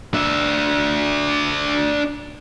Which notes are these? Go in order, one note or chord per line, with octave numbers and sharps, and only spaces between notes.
D4 E5